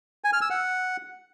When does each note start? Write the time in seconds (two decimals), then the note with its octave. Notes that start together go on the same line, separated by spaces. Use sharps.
0.24 G#5
0.33 F6
0.42 E6
0.50 F#5